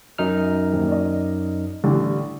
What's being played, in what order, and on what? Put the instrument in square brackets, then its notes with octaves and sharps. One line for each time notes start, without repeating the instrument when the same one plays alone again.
[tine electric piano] F#2 D#4 F6
[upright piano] D#1
D5 D#5
A1 D3 G3